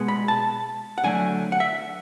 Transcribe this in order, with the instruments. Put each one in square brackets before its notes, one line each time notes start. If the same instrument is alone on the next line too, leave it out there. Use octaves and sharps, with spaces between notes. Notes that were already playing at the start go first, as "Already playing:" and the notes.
Already playing: [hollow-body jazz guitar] B2 G#3 B3
B5
A5
F#5
D3 F#3 A3 G#5
F#5
E5